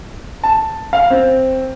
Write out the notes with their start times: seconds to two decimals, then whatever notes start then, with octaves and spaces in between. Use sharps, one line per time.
0.44 A5
0.93 F5
1.10 C4